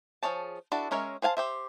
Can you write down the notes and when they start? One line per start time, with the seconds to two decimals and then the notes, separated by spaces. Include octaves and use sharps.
0.23 F3 F#4 G#4 C#5 A5
0.72 D4 E4 F#4 A4
0.91 G#3 C#4 A#4 C#5 E5
1.22 G#4 C5 F5 G#5 A5
1.37 G4 C5 E5